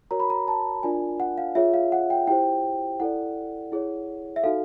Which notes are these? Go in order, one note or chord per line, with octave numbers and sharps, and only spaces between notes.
F#4 A#4 C#5 A#5
B5
A#5
A5
D4 F4 A#4 D5 G#5
F#5
F5
F4 G#4 C#5 E5
F5
F#5
G5
E4 G4 C5 G5
E4 A4 D5 F#5
E4 G#4 C#5
E5
D#4 F#4 A4 F5